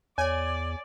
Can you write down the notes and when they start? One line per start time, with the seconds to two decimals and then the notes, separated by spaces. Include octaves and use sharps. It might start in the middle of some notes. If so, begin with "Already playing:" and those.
0.18 E2 C#5 D5 G#5